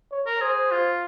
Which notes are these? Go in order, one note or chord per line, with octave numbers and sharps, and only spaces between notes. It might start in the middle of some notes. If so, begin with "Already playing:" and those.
C#5
A#4
G#4 C5
F4